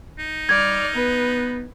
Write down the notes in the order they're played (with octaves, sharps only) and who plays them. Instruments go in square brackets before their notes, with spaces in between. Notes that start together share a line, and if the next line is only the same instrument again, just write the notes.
[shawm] D#4
[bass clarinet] G3 [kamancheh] D5 F6 [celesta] G#6
[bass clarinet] B3 [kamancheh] B4